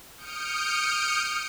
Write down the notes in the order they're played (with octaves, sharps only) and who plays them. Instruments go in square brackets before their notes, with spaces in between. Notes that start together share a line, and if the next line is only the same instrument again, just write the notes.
[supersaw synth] D#6 F6 G6 C#7 D7